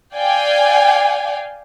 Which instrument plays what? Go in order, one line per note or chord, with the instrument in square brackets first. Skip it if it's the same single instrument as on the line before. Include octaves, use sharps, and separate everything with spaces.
[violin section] D5 F5 G5 G#5